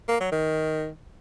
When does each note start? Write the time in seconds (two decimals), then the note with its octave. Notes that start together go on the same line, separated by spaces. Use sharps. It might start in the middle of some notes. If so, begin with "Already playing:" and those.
0.09 A#3
0.20 F#3
0.32 D#3